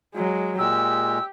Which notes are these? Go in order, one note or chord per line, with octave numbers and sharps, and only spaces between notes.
F#3 G#3
A#2 G#3 G4 E6